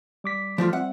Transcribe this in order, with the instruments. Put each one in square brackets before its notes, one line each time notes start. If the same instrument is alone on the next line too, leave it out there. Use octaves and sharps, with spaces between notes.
[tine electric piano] G3 D6 B6
[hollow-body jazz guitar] F3 A3 F4
[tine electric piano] G3 C4 E5 [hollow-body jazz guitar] F#5